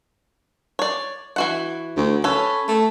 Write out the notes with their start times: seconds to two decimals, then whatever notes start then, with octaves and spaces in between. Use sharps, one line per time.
0.79 C#5 D5
1.36 E3 F#4 F#5
1.96 D2
2.24 C#4 A4 B4
2.68 A3